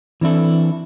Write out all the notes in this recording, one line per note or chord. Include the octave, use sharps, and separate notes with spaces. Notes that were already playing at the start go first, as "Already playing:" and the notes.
E3 C4 D4 E4 A4